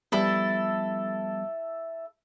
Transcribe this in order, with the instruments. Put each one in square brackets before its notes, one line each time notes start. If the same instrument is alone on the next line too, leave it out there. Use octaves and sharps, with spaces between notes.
[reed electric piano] F3 G3 B3 [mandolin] E4 A4